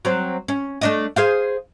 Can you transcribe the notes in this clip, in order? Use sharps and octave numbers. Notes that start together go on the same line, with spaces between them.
F#3 C4
C#4
A3 D4 D#5
G#4 C5 F5